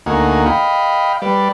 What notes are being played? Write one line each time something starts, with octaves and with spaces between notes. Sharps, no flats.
D2 A#3 D#4 F#4 G#5
D#5 F5 G5 B5
G3 B4 D5